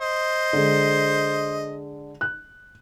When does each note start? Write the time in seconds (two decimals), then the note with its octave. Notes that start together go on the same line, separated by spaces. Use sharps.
0.01 C5 D#5
0.53 D3 G#3
2.21 F#6